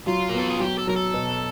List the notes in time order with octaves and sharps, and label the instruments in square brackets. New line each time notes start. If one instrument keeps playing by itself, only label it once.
[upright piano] F#3 [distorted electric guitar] F4
[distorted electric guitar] A#4
[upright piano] B3 [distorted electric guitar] A4
[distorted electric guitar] G#4
[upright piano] F#3 [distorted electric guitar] G4
[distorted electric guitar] A4
[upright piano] F#3 [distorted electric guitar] A#4
[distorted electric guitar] A4
[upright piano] B2